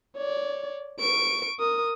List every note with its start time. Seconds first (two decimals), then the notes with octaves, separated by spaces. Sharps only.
0.16 C#5 D5
1.00 C#6 D7
1.59 A#4 D#6